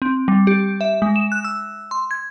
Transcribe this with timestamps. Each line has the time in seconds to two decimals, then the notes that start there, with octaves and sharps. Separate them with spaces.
0.02 C4
0.28 G3
0.47 G4
0.81 E5
1.02 G#3
1.16 E7
1.32 F#6
1.45 E6
1.91 C6
2.11 G#6